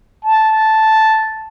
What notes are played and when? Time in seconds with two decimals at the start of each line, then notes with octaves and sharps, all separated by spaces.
0.25 A5